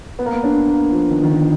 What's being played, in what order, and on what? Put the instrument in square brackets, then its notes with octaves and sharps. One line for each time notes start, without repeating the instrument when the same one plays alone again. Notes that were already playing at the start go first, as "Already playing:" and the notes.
[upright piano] B3
A#3
B3
D4
A#3
F3
D#3
D#3
D3